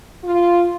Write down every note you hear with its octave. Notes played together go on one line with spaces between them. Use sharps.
F4